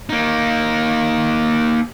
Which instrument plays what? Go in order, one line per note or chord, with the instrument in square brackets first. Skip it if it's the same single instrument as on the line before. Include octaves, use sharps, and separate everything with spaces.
[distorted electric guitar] A#3 D#4